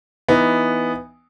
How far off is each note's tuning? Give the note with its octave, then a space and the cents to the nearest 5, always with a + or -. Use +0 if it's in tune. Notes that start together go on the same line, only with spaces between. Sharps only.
E3 +0 B3 +0 D#4 +0